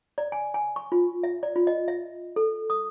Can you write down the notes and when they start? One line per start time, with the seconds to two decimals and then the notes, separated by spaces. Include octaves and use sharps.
0.18 D5
0.32 G#5
0.54 G#5
0.76 C#6
0.92 F4
1.23 E5
1.43 D5
1.56 F4
1.67 D#5
1.88 E5
2.36 A4
2.70 D#6